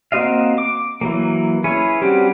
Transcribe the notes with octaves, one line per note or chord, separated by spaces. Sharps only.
A#3 C4 F#4 D#5 F5
D6
E3 F#3 A#3
C#4 E4 G#4 B4 C#5
G3 C4 C#4 F#4 G4